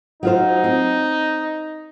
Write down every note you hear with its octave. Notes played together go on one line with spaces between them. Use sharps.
F#3 D#4 F4 C5
C4